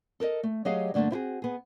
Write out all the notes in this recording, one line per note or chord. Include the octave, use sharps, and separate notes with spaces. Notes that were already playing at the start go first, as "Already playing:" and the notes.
A4 A#4 C5 D#5
A3
F#3 G4 G#4 D#5 F5
G2 D3 A3 A#3 D4
C4 E4 F#4 G#4
B3 G#4